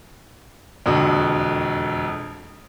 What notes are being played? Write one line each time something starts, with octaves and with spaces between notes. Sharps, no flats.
E1 F2 D3 F#4